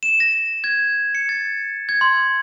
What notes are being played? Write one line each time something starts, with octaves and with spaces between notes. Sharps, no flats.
E7
A#6
G#6
C#7
A6
G#6
C6